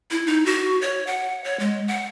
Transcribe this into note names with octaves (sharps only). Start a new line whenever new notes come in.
E4
D#4
F#4
C#5
F#5
C#5
G#3
F#5